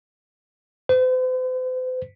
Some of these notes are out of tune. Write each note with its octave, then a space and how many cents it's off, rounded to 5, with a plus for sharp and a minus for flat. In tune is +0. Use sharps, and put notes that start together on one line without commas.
C5 -45